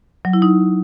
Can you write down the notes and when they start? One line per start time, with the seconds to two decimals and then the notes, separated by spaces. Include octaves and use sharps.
0.25 F#3
0.33 E4
0.42 D#4